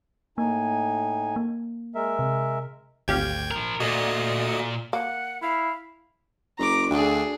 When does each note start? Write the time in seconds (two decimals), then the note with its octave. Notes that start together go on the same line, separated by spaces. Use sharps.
0.38 A2 A#3 D#4 G#5
1.36 A#3
1.95 G#3 A#4 E5
2.19 C3
3.08 G#1 D2 G4 F5 G5 G#6
3.51 F3 A#4
3.80 A#2 F#4 A4 D5 D#5
4.93 A#3 F#5
5.42 E4 F5
6.59 F#1 A#5 D6
6.90 D2 D4 G#4